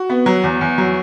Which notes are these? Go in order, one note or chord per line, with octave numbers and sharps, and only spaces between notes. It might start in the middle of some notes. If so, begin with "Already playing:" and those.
Already playing: F#4
B3
F#3
E2
E2
F#3